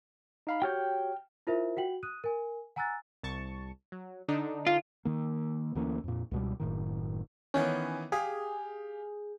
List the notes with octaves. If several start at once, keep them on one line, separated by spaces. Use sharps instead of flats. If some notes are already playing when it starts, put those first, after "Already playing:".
D#4 F5 B5
F#4 G4 C#5 G5 F6 G6
E4 F4 A#4 C5 E5
F#4 F#5 G5 F#7
D#6 F#6 D#7
A#4 G#5
F#5 G#5 A#5 E6 F#6 A6
C2 A5 C#6
F#3
D3 D4 D#4
F4
D#3 A#3
D2 E3 A#3 C#4
F2 A#2
C#2 B2 G3
F#1 A2 D#3
D#3 E3 B3 C#4
G4 G#4 F5